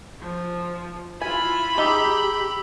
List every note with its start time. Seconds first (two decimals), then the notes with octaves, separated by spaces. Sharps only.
0.21 F3
1.21 E4 F4 G#5 B5
1.78 D#4 G4 G#4 D6 E6 G7